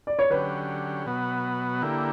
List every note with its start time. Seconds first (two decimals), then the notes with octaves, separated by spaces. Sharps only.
0.07 D5
0.19 C#5
0.30 D3 F#3 C#4 G4 B4
1.06 B2 F#3 B3 F#4
1.82 D3 A#3 E4 G4